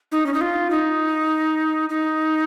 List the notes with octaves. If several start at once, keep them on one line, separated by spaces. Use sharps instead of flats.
D#4
C#4
D#4
F4
D#4
D#4